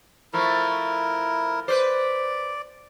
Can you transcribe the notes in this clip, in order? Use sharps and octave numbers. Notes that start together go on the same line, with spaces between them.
F3 A3 E4 A#4
B4 C5 D5